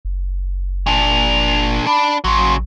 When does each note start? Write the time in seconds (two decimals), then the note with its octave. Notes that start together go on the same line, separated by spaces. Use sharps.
0.05 F#1
0.86 A#2 D4 F7
1.87 D4 B5
2.24 A1 C#3 F#3 C6